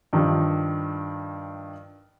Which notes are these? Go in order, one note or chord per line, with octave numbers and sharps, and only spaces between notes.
G2 D#3 F3